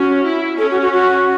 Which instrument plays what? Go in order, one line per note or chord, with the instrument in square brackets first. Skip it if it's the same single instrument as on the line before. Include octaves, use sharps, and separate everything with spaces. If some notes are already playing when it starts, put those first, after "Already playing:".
Already playing: [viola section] C#4 [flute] F#4
[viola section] E4
[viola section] C#4 [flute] A4
[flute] F#4
F#4
F#4